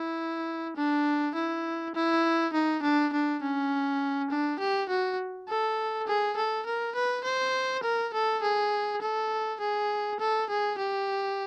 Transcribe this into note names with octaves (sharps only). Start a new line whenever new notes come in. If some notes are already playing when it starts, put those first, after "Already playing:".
Already playing: E4
D4
E4
E4
D#4
D4
D4
C#4
D4
G4
F#4
A4
G#4
A4
A#4
B4
C5
A#4
A4
G#4
A4
G#4
A4
G#4
G4